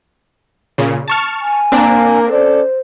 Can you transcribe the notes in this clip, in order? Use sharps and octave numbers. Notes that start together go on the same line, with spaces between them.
A#2 C#3
A5 C#6 F6
G#5
A#3 C4 D4
C#4 A4 C5 D5